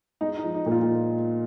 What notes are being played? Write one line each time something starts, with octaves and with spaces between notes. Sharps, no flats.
G#3 D#4
D#4
F3
D#4
A#2
F4